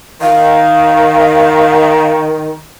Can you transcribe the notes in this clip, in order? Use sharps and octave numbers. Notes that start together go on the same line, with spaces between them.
D#3 F5